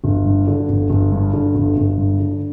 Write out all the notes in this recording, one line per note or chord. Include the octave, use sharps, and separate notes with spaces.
G1
G2
D3
G1
G1
G2
D3
G1
G1
G2
D3